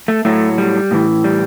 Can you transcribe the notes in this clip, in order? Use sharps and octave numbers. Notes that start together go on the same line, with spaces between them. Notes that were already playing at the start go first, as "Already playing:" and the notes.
A3
A2 F#3 A3
G3
A2 E3
G3